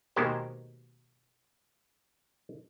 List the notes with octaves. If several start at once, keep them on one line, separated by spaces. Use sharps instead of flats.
D#2 B2 G#3 G4 A#4 C5